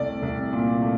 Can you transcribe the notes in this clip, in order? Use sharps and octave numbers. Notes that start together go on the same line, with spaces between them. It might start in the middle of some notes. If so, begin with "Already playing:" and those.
Already playing: C2 A3 D5
C2
A#2
A3